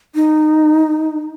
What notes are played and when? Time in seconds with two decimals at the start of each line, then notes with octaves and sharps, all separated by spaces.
0.15 D#4